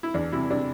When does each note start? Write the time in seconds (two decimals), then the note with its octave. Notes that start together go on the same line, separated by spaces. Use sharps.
0.03 E4
0.14 E2 D4
0.32 C3 E4
0.50 C3 D4